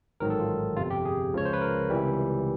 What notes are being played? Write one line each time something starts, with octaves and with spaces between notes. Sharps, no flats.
A1 G#2 D#3 F#3 A#4
A4
F4
G1 F2 C3 F4
G4
G#4
C#2 C#3 F3 C#5
C5
B4
A#4
C#2 C3 E3 G3